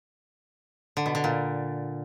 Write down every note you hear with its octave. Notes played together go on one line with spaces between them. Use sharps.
D3
B2
D3
A#2